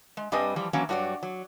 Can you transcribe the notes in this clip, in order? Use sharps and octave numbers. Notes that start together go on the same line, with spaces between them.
G#3
G2 G3 C4 B4 D#5 G#5
E3 F3 G3
E3 F#3 A#3 C#4
G2 F#3 F#4 C#5 D5
F#3